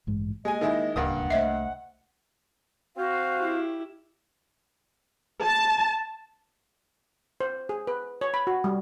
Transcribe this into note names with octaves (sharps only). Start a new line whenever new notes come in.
A1 G2 G#3
G#3 A#3 D#5 G#5
D#3 G#3 E4
D1 C#2 G2 A#3 F#5 D#6
C2 A3 C5 D#5 E5
C4 F#4 C5 F5
E4 G4
A5
C5
G#4
B4
C#5
B5
F#4
G3